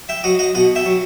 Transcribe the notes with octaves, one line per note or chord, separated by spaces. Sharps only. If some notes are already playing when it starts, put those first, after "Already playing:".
E5 G5
F#3 D#5 F#5
D#5 F#5
B2 D#5 F#5
E5 G5
F#3